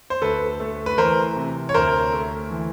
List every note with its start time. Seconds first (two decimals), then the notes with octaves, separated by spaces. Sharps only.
0.10 C5
0.22 D2 A4 B4
0.60 A3
0.86 B4
0.98 E3 A#4 C5
1.36 C3
1.69 C#5
1.74 D2 A#4 C5
2.13 A3
2.51 E3